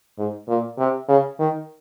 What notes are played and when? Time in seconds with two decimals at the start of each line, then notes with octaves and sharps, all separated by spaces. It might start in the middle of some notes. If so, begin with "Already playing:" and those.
0.18 G#2
0.48 A#2
0.79 C3
1.09 C#3
1.39 D#3